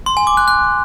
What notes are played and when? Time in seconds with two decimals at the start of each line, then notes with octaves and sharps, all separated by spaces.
0.06 C6
0.17 G#5
0.27 D6
0.37 F#6
0.48 F#6